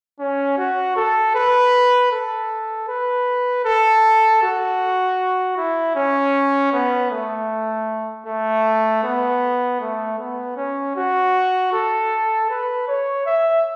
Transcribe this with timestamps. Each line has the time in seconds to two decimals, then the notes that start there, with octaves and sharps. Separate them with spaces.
0.19 C#4
0.57 F#4
0.96 A4
1.35 B4
2.12 A4
2.88 B4
3.65 A4
4.43 F#4
5.57 E4
5.96 C#4
6.73 B3
7.11 A3
8.27 A3
9.04 B3
9.81 A3
10.19 B3
10.57 C#4
10.96 F#4
11.73 A4
12.50 B4
12.88 C#5
13.26 E5